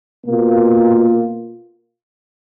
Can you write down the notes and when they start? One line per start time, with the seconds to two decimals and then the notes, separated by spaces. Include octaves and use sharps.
0.25 B2 A#3 F4